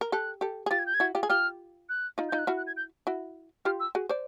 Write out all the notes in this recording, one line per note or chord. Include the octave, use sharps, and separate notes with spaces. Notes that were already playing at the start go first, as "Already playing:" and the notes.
A#4
G4 A4 F#6
G4 A4
G#4
F4 G4 A6
G#6
G6
G#6
E4 F#4
F4 G4
G#4
F4 G4 F6
F#6
D#4 F4
D#4 F4 G6
F#6
E4 F#4 F6
F#6
G#6
G6
E4 F#4
F4 G4 F6
E6
F#4 G#4
C5 D5